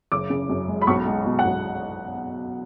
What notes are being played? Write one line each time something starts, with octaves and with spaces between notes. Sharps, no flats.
F#1 D6
C#3
F#2
G#3
B5
B1 C#6
G#3
B2
F#5
B1